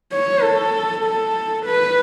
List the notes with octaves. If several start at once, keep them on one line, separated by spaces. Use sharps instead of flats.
C#5
A4
A4
B4